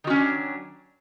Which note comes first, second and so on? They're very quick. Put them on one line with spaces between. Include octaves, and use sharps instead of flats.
D#3 F#4 C#4 F#3 D4